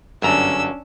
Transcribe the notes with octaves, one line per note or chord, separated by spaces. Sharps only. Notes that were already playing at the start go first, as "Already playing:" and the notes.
G1 F#2 C#4 D4 A#5 E6